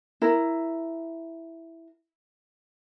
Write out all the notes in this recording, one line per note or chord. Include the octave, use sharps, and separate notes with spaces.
E4 A#4